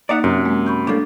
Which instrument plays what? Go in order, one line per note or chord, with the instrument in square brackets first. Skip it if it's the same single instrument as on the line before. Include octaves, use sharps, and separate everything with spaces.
[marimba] A#3 D#4 F#6 [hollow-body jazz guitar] D5 E5 F#5
[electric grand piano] F#2 [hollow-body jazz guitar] C3
[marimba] G#3 A#3
B5 C#6 G6
[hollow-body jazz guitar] A2 G3 A#3 [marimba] D4 A4